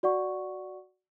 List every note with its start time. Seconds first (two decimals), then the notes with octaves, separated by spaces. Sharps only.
0.03 F#4 D5 F#5 C#6